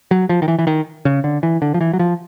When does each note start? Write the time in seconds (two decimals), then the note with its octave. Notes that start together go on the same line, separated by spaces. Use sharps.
0.11 F#3
0.29 F3
0.42 D#3
0.48 E3
0.59 E3
0.67 D#3
1.05 C#3
1.24 D3
1.43 E3
1.62 D3
1.74 F3
1.81 E3
1.93 F#3
1.99 F3